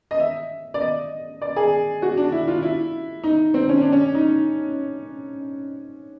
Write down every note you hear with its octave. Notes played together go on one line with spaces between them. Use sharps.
D#5
E5
D5
D#5
D5
G#4
F#4
D4
E4
F4
E4
D#4
C4
C#4
D4
C#4
D#4